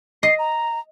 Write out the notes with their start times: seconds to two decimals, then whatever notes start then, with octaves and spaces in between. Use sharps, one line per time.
0.23 D#5 C7
0.39 A#5